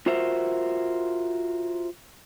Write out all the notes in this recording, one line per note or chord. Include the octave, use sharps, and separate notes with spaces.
F4 F#4 A#4 C5 E5